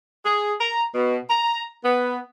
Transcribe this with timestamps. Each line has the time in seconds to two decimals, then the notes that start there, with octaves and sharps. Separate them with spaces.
0.24 G#4
0.59 A#5
0.94 B2
1.29 A#5
1.83 B3